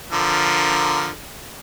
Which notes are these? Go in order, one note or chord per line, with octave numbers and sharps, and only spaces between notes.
D3 F3 A#4